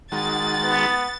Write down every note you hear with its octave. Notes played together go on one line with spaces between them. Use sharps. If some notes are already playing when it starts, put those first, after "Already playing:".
D#3 G#3 F#4 A6
B3